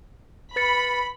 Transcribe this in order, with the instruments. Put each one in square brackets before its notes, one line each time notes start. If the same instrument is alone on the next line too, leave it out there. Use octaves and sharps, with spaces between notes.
[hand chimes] B4 A6 C#7 [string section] B5